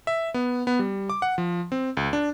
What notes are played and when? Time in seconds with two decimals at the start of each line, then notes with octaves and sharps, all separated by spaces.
0.07 E5
0.34 B3
0.67 B3
0.79 G3
1.10 D6
1.22 F#5
1.38 F3
1.72 C4
1.97 C#2
2.13 D4